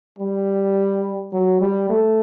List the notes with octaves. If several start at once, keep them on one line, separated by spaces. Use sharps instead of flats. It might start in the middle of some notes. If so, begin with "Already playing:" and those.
G3
F#3
G3
A3